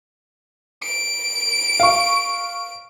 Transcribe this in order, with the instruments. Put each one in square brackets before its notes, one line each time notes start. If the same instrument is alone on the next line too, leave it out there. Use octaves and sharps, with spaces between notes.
[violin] D7
[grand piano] F5 C#6